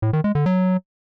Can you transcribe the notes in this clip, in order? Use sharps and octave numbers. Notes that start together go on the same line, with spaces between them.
A2
D#3
G#3
D3
F#3